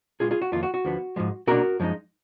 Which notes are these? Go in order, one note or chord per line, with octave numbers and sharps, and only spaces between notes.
A#2 G#3 B3 F4 G#4
F4 G#4
F#4
F2 D#3 A#3 F4
F#4
F#4
D2 D3 F3 B3
G#2 F3 G#3
B2 A#3 D4 F#4 A#4
F#2 F3 G#3 D#4